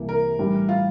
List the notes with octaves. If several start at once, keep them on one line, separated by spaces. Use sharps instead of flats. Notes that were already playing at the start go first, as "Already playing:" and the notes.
Already playing: C2 C3 E3 A#3
A#4
A2 E3 G3 D4
F4